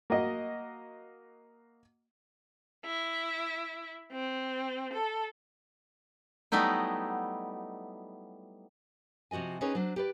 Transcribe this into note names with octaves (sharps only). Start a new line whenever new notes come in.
A#3 F#4 D#5
E4
C4
A4
F#3 G3 A3 B3 D#4 E4
C3 F3 F#4 D#5 G#5
C4 C#4 D#4 G#4 B4 C#5
F#3 D4 C5
G4 B4 D5